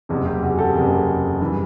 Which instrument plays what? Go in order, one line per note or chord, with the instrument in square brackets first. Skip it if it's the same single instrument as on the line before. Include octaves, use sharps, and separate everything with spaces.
[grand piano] F#1 E2 C3
G4
F#4 G#4
G4 A4
F#1 E2 C3 G#4 A#4
G2 E3 G3